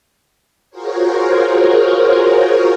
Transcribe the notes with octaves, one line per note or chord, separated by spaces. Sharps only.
F4 F#4 G#4 A#4 C5 C#5